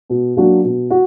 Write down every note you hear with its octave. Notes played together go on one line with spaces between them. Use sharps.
B2
F#3 A#3 D4 F#4
B2
F#4